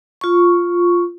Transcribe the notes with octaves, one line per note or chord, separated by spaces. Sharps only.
F4 C#6